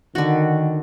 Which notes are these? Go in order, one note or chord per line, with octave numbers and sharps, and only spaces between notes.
D3 D#3 F#4